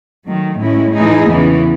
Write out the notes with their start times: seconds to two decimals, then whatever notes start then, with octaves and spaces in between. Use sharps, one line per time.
0.26 D#3 F#3 A3
0.60 A2 G#3 C#4 E4
0.94 A2 E3 A3 D#4 G#4
1.29 E2 C#3 E3 B3